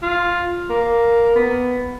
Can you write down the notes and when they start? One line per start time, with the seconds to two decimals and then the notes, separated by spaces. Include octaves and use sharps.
0.02 F4
0.70 A#3
1.36 B3